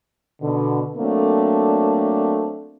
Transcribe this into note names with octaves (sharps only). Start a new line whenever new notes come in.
B2 D3
F#3 A3 A#3 C4 D4